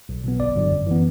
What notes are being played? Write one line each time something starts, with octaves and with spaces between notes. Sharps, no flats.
B1
B2 F#3 B3
G1 D5
G2 D3 F#3
F#2
E3 B3